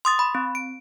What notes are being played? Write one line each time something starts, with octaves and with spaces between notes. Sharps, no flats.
C6 D#6 A6
B5
C4
D7